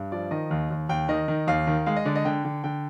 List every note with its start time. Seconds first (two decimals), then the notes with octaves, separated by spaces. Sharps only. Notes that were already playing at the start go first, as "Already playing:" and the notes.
Already playing: G2
0.12 F3 D5
0.31 D#3 D#5
0.51 D#2
0.71 D#2
0.89 D#2 G5
1.09 D#3 D#5
1.28 D#3
1.47 D#2 F5
1.67 D#3
1.86 G#3 F5
1.97 D#5
2.05 D3 D5
2.16 D#5
2.25 D3 G5
2.45 D3
2.64 D3 G5